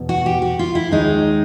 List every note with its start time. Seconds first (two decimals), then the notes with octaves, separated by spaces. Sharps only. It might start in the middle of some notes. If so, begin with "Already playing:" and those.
Already playing: E2 B2
0.09 F#4
0.26 G4
0.42 F#4
0.59 F4
0.75 E4
0.91 D#2 D#3 G#3 D#4